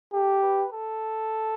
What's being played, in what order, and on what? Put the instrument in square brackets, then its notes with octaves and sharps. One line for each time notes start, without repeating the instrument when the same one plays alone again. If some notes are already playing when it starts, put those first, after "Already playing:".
[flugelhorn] G4 [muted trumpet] A4
[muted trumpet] B4
A4